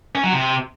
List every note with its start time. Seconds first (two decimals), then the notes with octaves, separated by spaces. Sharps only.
0.15 C#4
0.24 F#3
0.32 C3